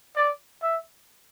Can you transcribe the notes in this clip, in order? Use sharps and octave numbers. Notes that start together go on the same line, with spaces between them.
D5
E5